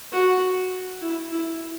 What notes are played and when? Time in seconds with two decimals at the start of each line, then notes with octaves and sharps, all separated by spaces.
0.12 F#4
1.02 E4
1.32 E4